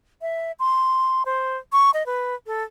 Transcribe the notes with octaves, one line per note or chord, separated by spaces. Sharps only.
E5
C6
C5
C#6
D#5
B4
A4